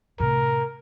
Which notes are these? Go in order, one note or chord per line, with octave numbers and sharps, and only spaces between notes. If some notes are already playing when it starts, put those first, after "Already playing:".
A2 C3 A#4